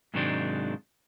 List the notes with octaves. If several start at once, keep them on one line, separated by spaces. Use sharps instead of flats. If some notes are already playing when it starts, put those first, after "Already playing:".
G#2 C3 D#3 F#3 G#3 D4